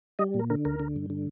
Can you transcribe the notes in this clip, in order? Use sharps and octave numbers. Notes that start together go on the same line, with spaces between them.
G3 D#5
A#2
A#4
D3 A#4
D2 A#4
D3
G2
D3